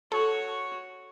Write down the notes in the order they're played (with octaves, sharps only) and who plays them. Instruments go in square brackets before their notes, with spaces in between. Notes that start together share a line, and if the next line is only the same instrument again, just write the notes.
[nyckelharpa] F#4 C#5 [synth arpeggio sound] A4